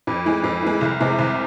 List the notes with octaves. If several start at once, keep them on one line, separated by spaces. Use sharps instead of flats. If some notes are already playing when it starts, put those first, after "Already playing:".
F2
E3 G#3
F2
E3 G#3
C2
C3 G#3
C2